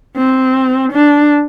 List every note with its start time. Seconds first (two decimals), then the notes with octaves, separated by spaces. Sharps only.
0.17 C4
0.92 D4